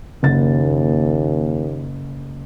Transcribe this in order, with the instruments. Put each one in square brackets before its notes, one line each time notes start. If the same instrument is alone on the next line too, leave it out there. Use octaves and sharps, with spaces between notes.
[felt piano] F#1 A6 [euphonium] D#2